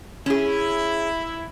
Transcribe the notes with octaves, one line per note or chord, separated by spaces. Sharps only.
C#4 E4 G#4